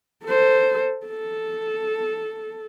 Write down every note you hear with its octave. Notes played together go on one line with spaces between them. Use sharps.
A4 C5
A4